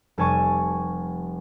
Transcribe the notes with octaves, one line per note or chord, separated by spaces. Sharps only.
F1 G3 G#5 A5 C#6 D#7